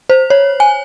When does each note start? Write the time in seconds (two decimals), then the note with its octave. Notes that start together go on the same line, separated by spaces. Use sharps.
0.10 C5
0.30 C#5
0.60 G#5